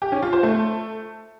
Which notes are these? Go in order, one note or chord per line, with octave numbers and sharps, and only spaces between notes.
G4
C#4
F4
C5
A3